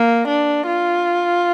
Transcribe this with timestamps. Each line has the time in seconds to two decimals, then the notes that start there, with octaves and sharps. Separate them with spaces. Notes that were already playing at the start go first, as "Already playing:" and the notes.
Already playing: A#3
0.28 D4
0.67 F4